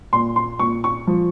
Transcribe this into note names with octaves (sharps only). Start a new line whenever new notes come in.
A#2 C6
C6
A#2 C#6
C#6
F3